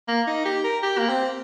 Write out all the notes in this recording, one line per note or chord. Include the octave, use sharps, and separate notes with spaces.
A#3
D#4
G4
A#4
G4
A#3
C4